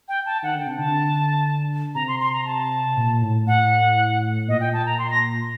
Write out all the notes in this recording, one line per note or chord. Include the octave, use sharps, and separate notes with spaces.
G5
A5
D#3 F#5
D3
G5
C3
D3 A5
C3 A#5
C6
C6
A#5
A5
A#2
A2
A2 F#5
A#2 D#5
G5
A5
A#5
C6
A#6